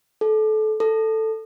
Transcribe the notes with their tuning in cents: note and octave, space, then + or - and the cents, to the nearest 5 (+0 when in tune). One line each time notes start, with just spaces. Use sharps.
A4 -25
A4 +5